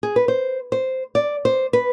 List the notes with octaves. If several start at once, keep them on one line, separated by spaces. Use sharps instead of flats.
G#4
B4
C5
C5
D5
C5
B4